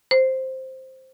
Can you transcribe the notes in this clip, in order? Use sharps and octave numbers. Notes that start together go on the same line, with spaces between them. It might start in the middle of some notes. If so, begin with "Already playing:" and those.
C5